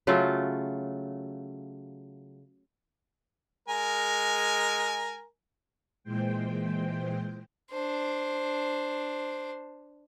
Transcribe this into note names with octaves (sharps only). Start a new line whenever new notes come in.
C#3 F#3 A3 F4
G#3 A#4 G#5
A#2 E3 G#3 C5 G5
D4 C5